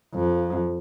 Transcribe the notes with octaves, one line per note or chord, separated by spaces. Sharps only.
F2